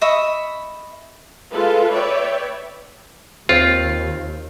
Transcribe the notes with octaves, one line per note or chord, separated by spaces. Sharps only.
D#5 E5 B5 C#6
G#3 F4 A4 B4
B4 C#5 D5 E5 G5
D#2 C4 F4